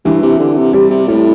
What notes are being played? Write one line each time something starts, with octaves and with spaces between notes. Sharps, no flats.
G2 E3
C3
D3
C3
C3 G3
C3
A2 G3